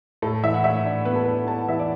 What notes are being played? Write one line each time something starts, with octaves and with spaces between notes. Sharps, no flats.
A2 A4
E3 E5
F#5
A2 E5
D4
B3 B4
A4
D4 B4
B3 A5
F#5
E3 E5
D5